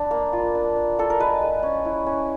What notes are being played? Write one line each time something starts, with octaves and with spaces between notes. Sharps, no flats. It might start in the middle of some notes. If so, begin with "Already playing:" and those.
Already playing: D4 B4
A#3
F4
D4
D4
F4 A4
A#4
G#3 B4
G#3
C#4
E4
C#4